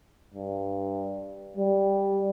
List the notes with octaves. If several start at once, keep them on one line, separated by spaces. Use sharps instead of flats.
G2
G3